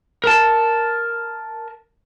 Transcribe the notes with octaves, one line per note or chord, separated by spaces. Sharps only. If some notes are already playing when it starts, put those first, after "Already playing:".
A#4 A5